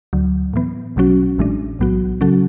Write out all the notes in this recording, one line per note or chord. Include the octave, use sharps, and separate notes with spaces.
D2 D3 F#3
A2 E3 B3
B1 B2 F#3 C#4 F#4
A1 A2 E3 G#3 D4
B1 A2 F#3 B3 F#4
C#3 F#3 C#4 F#4 A4